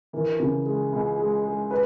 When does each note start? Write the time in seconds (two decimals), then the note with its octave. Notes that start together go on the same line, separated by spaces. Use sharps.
0.13 E3 A#4
0.40 C#3
0.66 G#3
0.93 C#2
1.19 G#3
1.45 G#3
1.71 B4